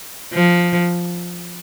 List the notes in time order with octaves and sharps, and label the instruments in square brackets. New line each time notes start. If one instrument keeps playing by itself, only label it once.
[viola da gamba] F3